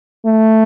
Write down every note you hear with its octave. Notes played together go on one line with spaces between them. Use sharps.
A3